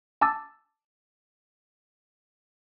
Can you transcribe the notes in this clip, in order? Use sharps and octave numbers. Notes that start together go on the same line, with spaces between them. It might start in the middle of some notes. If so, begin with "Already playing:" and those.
G#5 A5 D6 E6 A6